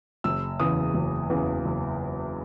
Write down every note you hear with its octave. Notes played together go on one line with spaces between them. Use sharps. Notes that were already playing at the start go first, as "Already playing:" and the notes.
F#1 E6
E2 C#3 E3 D#6
F#1
E2 C#3 E3
F#1